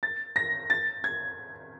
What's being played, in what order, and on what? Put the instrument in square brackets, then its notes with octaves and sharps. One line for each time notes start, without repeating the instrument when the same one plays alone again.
[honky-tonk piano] A6
A#6
A6
G#6